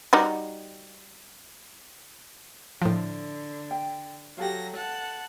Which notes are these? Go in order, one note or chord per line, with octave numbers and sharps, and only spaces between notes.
G3 D#4 F#4
A2 D3 F3
G5
F#3 G4 A4 F5 A#6
F#5 A5